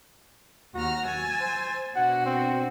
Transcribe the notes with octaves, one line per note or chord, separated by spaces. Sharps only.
D#2 F#4 A#5 F6
G#5 E6 A6
C5
B2 D4 F#4 F#5
C4